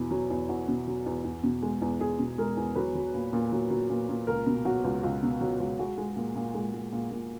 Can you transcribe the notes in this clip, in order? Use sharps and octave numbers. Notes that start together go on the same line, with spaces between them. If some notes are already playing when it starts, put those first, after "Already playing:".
Already playing: E2 B2 E4
F#3
E2
E2 F#4
B2
F#3
E2
E2
B2
G#3
E2
E2 G#4
B2
G#3 A#4
E2
F#3 B4
F#3
A#2
A#2
F#3
F#3
A#2
A#2
C#2 A#4
B2
F#3 F#4
C#2
C#2
B2
F#3
C#2
G#3 F#4
G#3
A#2
A#2
G#3
G#3
A#2
A#2